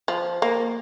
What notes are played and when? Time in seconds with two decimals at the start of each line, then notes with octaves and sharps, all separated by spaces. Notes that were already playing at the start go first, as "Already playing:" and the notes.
0.08 F3
0.42 A#3